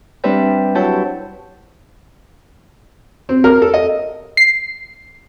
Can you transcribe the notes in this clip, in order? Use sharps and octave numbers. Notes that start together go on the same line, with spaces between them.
G3 C4 D4 G4 B4 E5
F#3 E4 A5 G6
C4
A#4
A4
D#5
C7